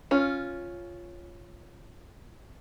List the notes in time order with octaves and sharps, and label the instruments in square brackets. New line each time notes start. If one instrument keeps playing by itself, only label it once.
[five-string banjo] C#4 F4